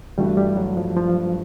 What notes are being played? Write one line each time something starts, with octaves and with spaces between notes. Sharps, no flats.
G2 E3 G3 A3 D4 F#4
G3
F#3
F3
F3